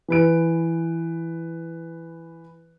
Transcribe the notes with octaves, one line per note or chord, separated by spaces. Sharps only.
E3 B4 D7